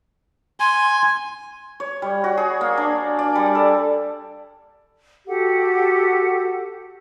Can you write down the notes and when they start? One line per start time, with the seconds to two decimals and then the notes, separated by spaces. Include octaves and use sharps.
0.60 G#5 C6
1.80 C#5
2.02 G3
2.24 F#4
2.37 G#4
2.61 A#3
2.78 D4
3.19 D5
3.35 G3
3.55 A4
5.27 F#4 G4 A4 F#5